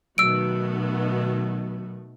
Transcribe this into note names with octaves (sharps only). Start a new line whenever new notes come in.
B2 D#3 F#3 A3 B3 F#4 E6 D7